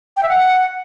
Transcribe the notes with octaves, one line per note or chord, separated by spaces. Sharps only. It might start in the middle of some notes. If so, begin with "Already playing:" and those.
G5
E5
F#5